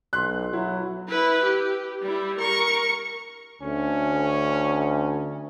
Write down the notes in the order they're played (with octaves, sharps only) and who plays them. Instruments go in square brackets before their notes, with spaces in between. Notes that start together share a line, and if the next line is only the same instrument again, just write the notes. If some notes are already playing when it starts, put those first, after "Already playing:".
[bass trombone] B1 [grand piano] C6 F#6
[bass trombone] F#3 [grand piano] E4
[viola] E4 B4
G4
G3 E4
A#4 C#6
[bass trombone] D2 [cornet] C#4